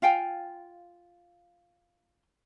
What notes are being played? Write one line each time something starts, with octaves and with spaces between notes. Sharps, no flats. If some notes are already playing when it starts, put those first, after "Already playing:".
F4 F5 G5 G#5